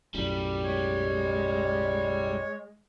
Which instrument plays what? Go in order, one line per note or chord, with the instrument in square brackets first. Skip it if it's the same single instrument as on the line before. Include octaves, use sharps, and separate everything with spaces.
[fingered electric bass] B1 F#2 A2 [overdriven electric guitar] G3
[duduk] G#3 [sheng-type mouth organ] C#5